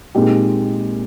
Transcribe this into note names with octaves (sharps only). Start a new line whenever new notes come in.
A#2 G#3 C4 D#4 G4